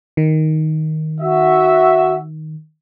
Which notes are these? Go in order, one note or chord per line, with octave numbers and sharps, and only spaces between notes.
D#3
F#4 E5